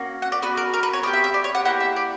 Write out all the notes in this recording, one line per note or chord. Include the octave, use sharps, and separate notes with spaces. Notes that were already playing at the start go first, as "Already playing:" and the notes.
Already playing: A#3 C#4 F#4
F#5
D5
B3 F#4 B4
A#4
A#4
B4
C#5
B3 E4 G4 D5
E5
E5
D5
C#5
F#5
A#3 E4 G4 F#5
E5
D5